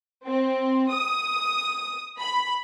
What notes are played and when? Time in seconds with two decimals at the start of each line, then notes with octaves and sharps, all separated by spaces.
0.25 C4
0.92 D#6
2.20 B5